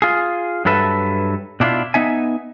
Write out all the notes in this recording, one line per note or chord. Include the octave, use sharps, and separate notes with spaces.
F4 G#4
G2 F#3 A4 B4 E5 A5
B2 D4 E4 F4
B3 D#4 E5 G#5